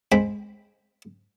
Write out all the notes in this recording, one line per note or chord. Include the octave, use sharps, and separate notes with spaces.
G#3 C4 G5 B5